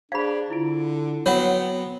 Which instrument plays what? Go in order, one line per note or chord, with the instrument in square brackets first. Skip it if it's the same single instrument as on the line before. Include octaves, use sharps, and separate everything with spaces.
[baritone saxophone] D4 [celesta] G#4 C5 G#6 [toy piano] F5 B5
[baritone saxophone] D3 [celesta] E4 F4 D7
[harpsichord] F#3 C4 [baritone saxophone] B3 [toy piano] C#5 F#5 [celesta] B5